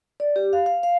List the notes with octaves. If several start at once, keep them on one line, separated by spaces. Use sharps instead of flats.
D5
G4
F5
F5
F5